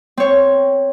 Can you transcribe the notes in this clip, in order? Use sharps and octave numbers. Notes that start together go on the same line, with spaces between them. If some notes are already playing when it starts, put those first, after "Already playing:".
C4 C#5